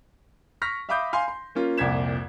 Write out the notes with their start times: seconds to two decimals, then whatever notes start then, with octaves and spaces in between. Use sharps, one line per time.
0.62 C#6 F6 A#6 B6
0.89 E5 F5 B5 D6 D#6 G6
1.13 F5 G#5 C6
1.28 C6
1.55 A#3 C#4 F4
1.78 C2 F2 A#2 G#6 B6 E7